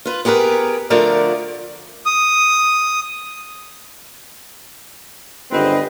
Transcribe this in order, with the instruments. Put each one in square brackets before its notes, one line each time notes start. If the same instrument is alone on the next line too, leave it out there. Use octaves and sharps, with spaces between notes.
[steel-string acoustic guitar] F4 B4
B3 G4 G#4 A#4 B4
D3 F3 A3 A#4 D5 F5
[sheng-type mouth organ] D#6
[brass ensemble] G1 [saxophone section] D#3 G#3 C4 [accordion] B4 [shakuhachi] D#5